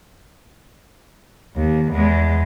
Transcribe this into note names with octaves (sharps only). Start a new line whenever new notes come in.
D#2
E2 G#3